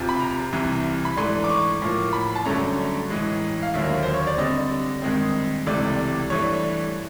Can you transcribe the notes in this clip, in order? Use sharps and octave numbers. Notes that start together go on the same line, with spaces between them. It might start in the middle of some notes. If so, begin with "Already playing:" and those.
Already playing: F2 C3 F3
B5
A#5
C2 C3 E3
B5
G#2 E3 A3 D4 C6
D6
C#6
A2 F3 A#3
B5
A5
G2 D3 F#3 A3 C#4 A#5
A2 E3 G#3
F5
D#2 D3 F#3 A#3 E5
C5
C#5
D5
D3 G3 C4 D#5
G2 D#3 G#3 C4
C#2 C3 E3 A3 D5
G2 E3 A3 D4 C#5